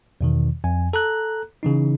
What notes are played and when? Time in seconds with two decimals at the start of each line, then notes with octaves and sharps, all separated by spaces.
0.21 E2 B2 D#3
0.64 F2 G#5
0.93 A4 A#5 F#6
1.63 C#3 E3 D#4